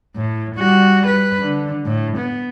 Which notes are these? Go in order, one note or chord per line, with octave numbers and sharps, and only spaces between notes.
A2
G3 F#4
B4
D3
A2
B3